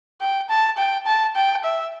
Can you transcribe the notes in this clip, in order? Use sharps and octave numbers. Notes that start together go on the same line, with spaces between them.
G5
A5
G5
A5
G5
E5